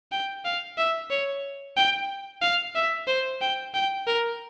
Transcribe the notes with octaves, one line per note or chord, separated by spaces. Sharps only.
G5
F5
E5
C#5
G5
F5
E5
C5
G5
G5
A#4